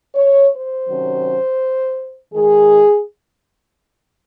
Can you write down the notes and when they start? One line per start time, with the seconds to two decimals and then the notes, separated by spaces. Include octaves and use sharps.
0.15 C#5
0.52 C5
0.89 C3 D#3 F#3 C#4
2.34 G#2 D#3 G#3 G#4